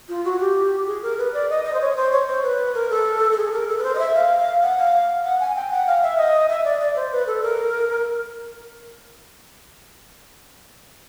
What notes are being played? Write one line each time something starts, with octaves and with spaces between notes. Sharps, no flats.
F4
F#4
G4
G#4
A#4
B4
D5
D#5
D#5
C5
C#5
C5
C#5
C5
B4
A#4
A4
A4
G#4
A#4
A4
B4
C5
D#5
E5
F5
F#5
F5
F#5
G#5
G5
F#5
F5
E5
D#5
E5
D5
D5
C5
B4
A4
A#4